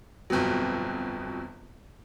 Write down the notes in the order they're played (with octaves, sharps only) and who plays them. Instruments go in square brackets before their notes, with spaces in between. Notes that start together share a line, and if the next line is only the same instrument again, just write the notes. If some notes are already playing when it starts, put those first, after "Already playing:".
[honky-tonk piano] G1 F2 B2 F#3